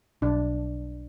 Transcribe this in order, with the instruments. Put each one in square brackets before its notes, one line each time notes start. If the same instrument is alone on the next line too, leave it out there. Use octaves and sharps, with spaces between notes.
[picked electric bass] B1 [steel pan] D4